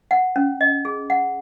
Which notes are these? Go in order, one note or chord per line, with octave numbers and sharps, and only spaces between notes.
F#5
C#4
D#5
G#4
F#5